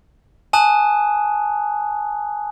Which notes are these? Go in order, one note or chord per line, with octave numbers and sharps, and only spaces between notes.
G#5 A5 D#6 F#6